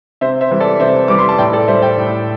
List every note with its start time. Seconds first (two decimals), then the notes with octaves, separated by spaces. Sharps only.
0.21 C3 C5 E5
0.41 C5 E5
0.51 E3 G3
0.60 A4 D5
0.80 C3 C5 E5
1.08 E3 G3 D6
1.19 C6
1.29 A5
1.38 A2 D5 G5
1.53 A4 D5
1.68 G3 C5 E5
1.82 D5 G5
1.97 A2